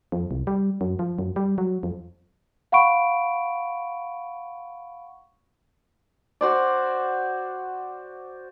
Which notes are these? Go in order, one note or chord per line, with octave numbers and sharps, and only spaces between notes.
F2
C2
G3
F#2
F3
F#2
G3
F#3
F2
F5 F#5 B5 C#6 D7
F#4 C5 D5